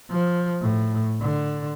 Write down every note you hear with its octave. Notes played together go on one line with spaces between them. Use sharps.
F3
A2
D3